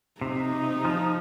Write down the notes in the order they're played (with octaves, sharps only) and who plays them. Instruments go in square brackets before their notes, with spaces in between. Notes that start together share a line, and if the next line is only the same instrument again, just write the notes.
[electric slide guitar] C3 [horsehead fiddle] D#4
[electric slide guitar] F3